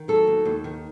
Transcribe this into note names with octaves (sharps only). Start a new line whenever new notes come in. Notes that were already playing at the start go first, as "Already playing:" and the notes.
Already playing: D#3
F#3 A4
D#2
D#2
D#3